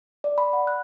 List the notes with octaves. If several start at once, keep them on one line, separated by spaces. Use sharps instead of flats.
D5
B5
F#5
F#6